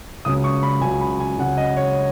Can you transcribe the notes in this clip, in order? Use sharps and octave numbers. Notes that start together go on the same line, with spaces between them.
C#2 C#3 F#3 D#6
C#6
B5
C#2 C#3 F#3 G#5
B5
G#5
C#2 C#3 F#3 F#5
D#5
C#5